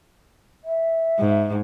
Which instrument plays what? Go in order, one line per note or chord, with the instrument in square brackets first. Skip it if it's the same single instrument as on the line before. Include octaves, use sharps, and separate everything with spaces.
[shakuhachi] E5
[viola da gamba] G#2